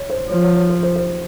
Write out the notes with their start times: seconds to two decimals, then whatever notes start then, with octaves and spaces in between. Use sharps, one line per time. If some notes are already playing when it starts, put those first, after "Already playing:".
Already playing: C#5
0.10 C5
0.29 F3 C#5
0.42 C#5
0.56 C#5
0.69 C5
0.83 C5
0.96 C5